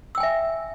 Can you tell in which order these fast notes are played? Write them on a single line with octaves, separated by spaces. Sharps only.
E6 G5 G#5 E5